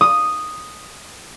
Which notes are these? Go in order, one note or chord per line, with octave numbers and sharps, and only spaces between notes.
D#6